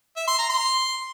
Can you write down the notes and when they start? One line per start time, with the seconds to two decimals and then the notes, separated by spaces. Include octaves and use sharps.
0.16 E5
0.27 C6
0.38 A#5
0.49 C6